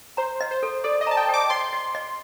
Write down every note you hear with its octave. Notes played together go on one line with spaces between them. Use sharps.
C5 A#5
D#5
C5
A4
A4 D5
D#5
A5 A#5
G5
G5 D6
D#5 C6
D#5
D#5